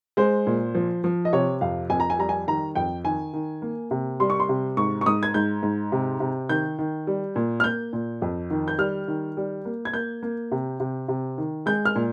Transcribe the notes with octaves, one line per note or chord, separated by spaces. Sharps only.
G#3 C5
A#2
F3
F3
D#5
C3 C#5
F2 F5
F2 G#5
A#5
G#5
G3 A#5
G#5
D#3 A#5
F2 G5
D#3 G#5
D#3
A#3
C3
G3 C6
C#6
C6
C3
G#2 C#6
C#6
G#2 D#6
G#6
G#2 G6
G#2
C3
C3
D#3 G6
D#3
G3
A#2
F6
A#3 G6
A#2
F2
D#3
G6
G3 F6
D#3
G3
A#3
G#6
A#3 G6
A#3
C3
C3
C3
D#3
G#3 G6
F6
A#2